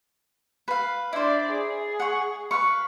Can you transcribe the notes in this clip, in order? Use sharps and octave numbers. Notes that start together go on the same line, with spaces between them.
B4 F5
D4 E4 C5 D5
G#4
F#5 C#6
B4 F5 C#6